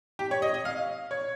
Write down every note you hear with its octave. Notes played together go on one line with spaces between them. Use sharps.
G4
C#5
D#5
D#5
F5
C#5